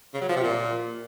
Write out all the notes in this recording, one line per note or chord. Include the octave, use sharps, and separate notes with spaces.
C#3
F#3
F3
C3
A#2